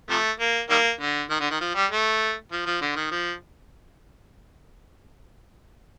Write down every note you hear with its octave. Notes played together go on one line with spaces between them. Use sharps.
C3 F3 A3
A#3
D#3 G3 A#3
D3
D#3
D3
D#3
F3
G3
A3
F3
F3
D3
D#3
F3